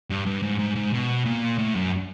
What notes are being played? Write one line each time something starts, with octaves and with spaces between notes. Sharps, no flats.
G2
G2
G#2
G#2
G#2
B2
A#2
A2
F#2